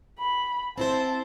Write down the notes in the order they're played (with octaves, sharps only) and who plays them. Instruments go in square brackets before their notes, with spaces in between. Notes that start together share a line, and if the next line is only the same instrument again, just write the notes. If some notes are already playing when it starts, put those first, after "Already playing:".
[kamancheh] B5
[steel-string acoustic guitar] C4 E4 C5 [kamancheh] A5